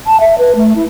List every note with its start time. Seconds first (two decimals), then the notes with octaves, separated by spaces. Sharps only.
0.07 A5
0.20 E5
0.38 B4
0.55 A3
0.76 E4